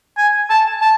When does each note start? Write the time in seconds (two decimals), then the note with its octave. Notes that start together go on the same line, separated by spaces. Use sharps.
0.17 G#5
0.50 A5
0.81 A5